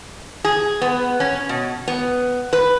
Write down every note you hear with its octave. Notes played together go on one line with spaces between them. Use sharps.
G#4
B3
C#4
B2
B3
B4